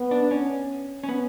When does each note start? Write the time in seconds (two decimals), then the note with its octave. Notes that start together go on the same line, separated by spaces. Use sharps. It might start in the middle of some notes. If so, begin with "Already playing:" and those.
Already playing: B3
0.11 D4
0.31 C#4
1.04 C#4
1.09 B3